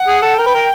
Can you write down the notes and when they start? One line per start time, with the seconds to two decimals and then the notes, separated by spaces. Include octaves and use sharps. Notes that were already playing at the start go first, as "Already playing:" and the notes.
Already playing: F#5
0.08 G#4
0.22 A4
0.38 A#4 G5
0.46 B4
0.54 A#4